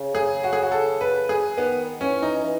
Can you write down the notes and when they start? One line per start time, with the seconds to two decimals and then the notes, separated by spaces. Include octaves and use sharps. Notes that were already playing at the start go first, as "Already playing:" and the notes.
Already playing: C#3
0.15 G#4
0.44 F#4
0.53 G#4
0.62 F#4
0.72 A4
1.01 B4
1.29 G#4
1.57 D#3 B3
2.01 E3 C#4
2.22 D#4
2.44 E3